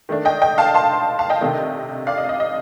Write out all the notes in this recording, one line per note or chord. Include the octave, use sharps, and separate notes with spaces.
D#3 A3 D4
D#5 G5
D#5 G5
F5 A5
A5 C6
F5 A5
D#5 G5
C3 D#3 A3 D4
D5 F5
D#5
D#5
D#5